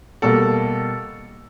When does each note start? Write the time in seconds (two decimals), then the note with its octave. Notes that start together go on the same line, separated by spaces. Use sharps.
0.22 B2 G3 A#3 A4